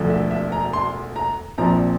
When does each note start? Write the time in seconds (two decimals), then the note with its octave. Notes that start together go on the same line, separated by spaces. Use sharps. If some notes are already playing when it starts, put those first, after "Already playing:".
Already playing: E1 D2 D3 F3
0.10 E5
0.31 E5
0.52 A#5
0.73 C6
1.16 A#5
1.58 A#1 A#2 F3 C4 A#5